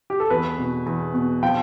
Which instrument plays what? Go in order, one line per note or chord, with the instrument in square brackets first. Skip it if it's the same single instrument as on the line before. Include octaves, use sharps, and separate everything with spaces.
[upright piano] G4
A4
E2 B4
B2
E2
B2
F3 G5